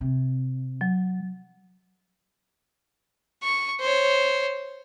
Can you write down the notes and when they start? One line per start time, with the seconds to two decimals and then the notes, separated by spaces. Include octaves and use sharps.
0.01 C3
0.81 F#3
3.43 C#6
3.80 C5 C#5